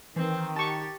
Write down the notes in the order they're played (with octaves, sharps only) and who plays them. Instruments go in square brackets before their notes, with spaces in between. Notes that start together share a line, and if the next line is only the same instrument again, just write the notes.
[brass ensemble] D#3 [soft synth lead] E3 [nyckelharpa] C4
[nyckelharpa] G4 [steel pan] A5 C#6 [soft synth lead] A6